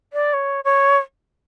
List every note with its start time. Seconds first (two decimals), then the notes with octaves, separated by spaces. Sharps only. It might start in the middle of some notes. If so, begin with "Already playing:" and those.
0.13 D5
0.33 C#5
0.64 C#5